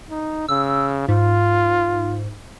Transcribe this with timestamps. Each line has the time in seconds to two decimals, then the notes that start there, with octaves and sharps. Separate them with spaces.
0.10 D#4
0.48 C#3 E6
1.08 G#2 F4